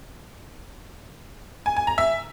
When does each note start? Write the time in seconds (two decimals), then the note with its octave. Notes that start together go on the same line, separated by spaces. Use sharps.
1.66 G#5
1.77 G#5
1.87 A#5
1.98 E5